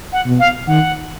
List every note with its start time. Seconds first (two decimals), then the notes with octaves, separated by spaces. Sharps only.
0.13 F#5
0.26 B2
0.40 F5
0.67 D#3 F#5